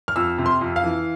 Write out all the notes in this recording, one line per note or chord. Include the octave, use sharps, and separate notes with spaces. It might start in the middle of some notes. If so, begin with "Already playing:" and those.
F6
F2 E6
C3
C6
F2
F5
E3